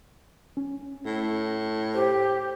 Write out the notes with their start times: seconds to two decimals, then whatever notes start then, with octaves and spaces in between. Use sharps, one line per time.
0.57 C#4
1.06 A2
1.94 G4 C5